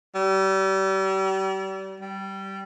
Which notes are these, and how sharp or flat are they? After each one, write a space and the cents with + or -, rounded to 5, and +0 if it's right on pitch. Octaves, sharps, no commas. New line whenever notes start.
G3 -35
G3 -15